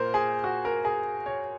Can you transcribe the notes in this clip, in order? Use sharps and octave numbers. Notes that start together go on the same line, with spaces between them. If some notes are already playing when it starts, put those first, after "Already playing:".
Already playing: A#2 A#4 C5
G#4
F#4
A#4
G#4
C#5